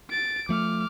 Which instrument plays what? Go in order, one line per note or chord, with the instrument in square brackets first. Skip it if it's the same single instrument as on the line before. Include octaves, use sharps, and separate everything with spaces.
[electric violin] A6 D7
[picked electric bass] F3 A3 [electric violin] D6 F6